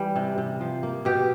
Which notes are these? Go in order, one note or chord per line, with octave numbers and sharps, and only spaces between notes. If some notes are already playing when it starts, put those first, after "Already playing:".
Already playing: E3 G3
C3
C3
F3
A#3
B2 G4